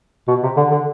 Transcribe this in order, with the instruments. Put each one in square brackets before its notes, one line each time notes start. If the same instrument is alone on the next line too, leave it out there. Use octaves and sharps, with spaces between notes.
[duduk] B2
C3
D3
D3